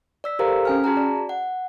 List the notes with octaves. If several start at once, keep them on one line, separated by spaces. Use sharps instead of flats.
D5 E6 B6
G4 A4 A#4 C5 F5 A#5
C#4 G#5 F6
F#4 G#4 A5 A#5
D5
F#5